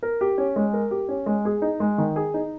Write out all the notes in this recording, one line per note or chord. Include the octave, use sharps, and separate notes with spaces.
A#4
G4
C#4
G#3
A#4
G4
C#4
G#3
G#4
D#4
G#3
D#3
G#4
D#4